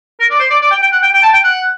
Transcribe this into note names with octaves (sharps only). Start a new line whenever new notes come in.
A#4
D5
C5
D5
D5
G5
G5
F#5
G5
G5
A5
G5
F#5